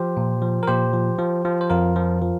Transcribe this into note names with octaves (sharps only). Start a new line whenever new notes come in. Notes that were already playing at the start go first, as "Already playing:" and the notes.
Already playing: F3 G4 C5
A#2
F3
A#4
A#2 G4 C5
F3
F3
F3
C5
F2 F4 A#4
F3
F3